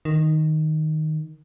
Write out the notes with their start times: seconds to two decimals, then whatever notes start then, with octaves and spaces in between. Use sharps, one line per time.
0.05 D#3